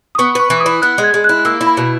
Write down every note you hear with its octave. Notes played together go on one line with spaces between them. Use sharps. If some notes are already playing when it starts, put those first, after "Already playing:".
D#6
B3 C#6
B4 C#6
E3
D#6
E4
B3 F#6
G#3
G#6
G#3
E4 F#6
F#6
A#3 E6
E4
B5
B2